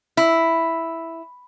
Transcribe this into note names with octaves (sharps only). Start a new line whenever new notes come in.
E4